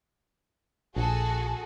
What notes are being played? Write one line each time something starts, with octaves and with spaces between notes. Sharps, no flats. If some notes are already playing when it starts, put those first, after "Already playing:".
A#1 F#4 G#4 A4